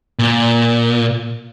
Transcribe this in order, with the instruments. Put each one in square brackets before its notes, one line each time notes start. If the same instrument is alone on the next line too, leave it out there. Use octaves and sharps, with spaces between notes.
[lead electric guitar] A#2